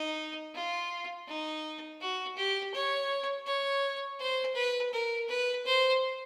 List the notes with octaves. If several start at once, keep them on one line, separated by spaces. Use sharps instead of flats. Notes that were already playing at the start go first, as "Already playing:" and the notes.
Already playing: D#4
F4
D#4
F#4
G4
C#5
C#5
C5
B4
A#4
B4
C5